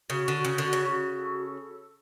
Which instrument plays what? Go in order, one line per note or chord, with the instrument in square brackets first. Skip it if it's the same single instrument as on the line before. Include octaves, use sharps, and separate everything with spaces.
[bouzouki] C#3 [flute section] F#4
[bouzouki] D3
[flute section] F#4
[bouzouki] C#3
[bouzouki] D3 [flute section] F#4
[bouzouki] C#3
[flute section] F#4
A4